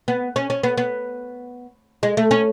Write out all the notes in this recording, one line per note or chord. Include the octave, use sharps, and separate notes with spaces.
B3
C#4
C#4
B3
B3
G#3
A3
C#4